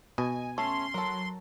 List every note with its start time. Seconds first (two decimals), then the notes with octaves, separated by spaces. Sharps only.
0.18 B2 D#5 G#5
0.58 A3 C#4 C6
0.94 F#3 A4 A#4